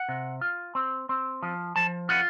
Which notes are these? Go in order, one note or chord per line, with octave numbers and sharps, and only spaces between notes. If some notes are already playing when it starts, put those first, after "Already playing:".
Already playing: F#5
C3
F4
C4
C4
F3
F3 A5
F4 F#5